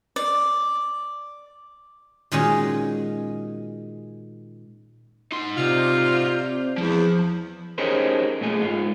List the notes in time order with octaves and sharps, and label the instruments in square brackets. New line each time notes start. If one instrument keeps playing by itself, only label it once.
[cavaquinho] D5
[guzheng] A#2 D#3 G#3 C#4 F#4
[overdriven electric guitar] D#4 C6
[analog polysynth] C3 D5 G6 [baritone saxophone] F4
[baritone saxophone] E2 [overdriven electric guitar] F3
[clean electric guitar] C#4 D#4 G4 G#4 A#4 C5
A#2 A3 G#4
G#2 F4